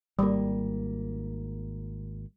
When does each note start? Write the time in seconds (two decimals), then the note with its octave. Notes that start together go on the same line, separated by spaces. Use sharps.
0.19 G#1 G3 A#3